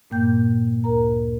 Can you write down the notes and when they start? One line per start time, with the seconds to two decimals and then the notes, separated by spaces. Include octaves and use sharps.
0.10 G2 A#2 A#3 G5 G6
0.84 D2 A#4 A#5